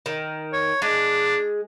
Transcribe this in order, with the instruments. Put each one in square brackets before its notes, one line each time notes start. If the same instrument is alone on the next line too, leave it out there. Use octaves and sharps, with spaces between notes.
[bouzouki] D#3
[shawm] C#5
[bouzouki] G#3 [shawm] D4